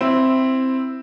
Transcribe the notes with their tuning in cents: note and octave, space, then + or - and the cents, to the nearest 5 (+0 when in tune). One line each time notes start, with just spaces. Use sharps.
C4 +0 E4 +0